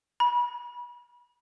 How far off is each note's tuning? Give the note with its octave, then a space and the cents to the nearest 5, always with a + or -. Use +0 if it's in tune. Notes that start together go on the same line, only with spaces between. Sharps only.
B5 -30